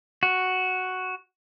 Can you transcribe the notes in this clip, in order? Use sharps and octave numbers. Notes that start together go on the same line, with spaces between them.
F#4